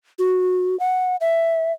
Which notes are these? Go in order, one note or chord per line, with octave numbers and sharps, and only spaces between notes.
F#4
F#5
E5